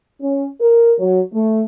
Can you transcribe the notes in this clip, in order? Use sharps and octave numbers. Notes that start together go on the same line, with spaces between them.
C#4
A#4
F#3
A3